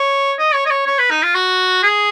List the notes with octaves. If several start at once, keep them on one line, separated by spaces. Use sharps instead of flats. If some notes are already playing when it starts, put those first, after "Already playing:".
Already playing: C#5
D#5
C#5
D#5
C#5
C#5
B4
D#4
F4
F#4
G#4